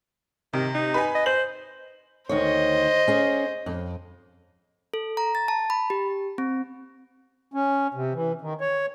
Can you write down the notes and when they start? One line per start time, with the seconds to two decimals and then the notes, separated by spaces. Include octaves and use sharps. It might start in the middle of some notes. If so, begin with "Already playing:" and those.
0.53 C3 D#3
0.74 D#4
0.94 B4 G#5
1.15 D#5
1.26 C5 F#7
2.29 D2 D#3 C5 C#5 D#5
3.08 C#4 G#4
3.66 F2
4.94 A4
5.17 A#5
5.35 A6
5.48 A5
5.70 B5
5.90 G4
6.38 C4
7.54 C#4
7.94 C3
8.13 E3
8.41 D#3
8.61 C#5